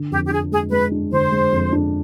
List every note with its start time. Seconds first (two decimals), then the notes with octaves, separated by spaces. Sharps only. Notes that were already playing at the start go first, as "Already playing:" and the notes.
Already playing: D3
0.11 F2 G4
0.26 G4
0.31 D4 G#4
0.51 G#3 G#4
0.71 G#3 B4
0.91 D4
1.12 D3 C5
1.32 G#3
1.52 F2
1.72 D4